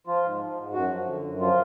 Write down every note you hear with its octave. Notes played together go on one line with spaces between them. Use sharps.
F3 F4
G#2
F3
G#2
F#2 F#4
F3
D3
F#2
F3 F4